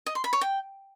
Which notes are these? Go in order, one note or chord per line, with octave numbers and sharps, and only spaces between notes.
D#5
C6
B5
C#5
G5